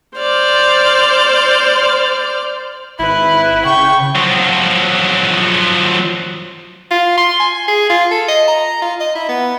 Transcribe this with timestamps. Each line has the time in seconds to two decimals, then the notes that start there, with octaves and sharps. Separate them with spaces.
0.17 C5 D5 F6
2.99 G#1 E4 B4
3.65 C#3 G5 C#6
4.15 F3 F#3
6.91 F4
7.18 C6
7.40 G#5
7.68 G#4
7.90 F4
8.11 A4
8.28 D#5
8.48 A#5
8.82 F4
9.00 D#5
9.15 E4
9.29 B3